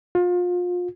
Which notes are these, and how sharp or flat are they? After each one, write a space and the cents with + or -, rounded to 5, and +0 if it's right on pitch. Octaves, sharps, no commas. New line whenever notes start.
F4 +30